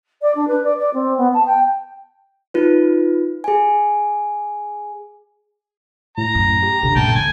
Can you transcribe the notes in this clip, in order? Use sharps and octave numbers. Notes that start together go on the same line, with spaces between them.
D5
D4
B4
D5
D5
C4
B3
A5
G5
D#4 F4 B4
G#4 G#5
A2 A#5
F#2
G4
F#2 B2 D3
A#2 G5 A5
F3 G#5